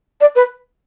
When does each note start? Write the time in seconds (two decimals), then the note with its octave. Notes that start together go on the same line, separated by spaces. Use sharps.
0.21 D5
0.35 B4